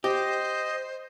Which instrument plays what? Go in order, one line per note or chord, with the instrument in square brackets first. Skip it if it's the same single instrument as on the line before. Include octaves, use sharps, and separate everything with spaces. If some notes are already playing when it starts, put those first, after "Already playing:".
[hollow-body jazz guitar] G4 [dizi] C5 [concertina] D#5